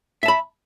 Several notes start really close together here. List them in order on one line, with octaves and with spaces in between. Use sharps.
E5 A5 B5